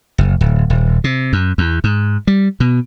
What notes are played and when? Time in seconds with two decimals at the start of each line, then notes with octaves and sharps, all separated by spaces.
0.18 F#1
0.41 D1
0.70 D#1
1.04 C3
1.33 F#2
1.58 E2
1.84 G#2
2.27 G3
2.60 B2